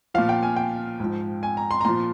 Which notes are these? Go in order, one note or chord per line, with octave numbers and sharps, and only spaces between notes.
A#2 F3 F5
G5
G#5
G5
G#2 F3
G#5
A#5
C6
A#5
A#2 F3 C6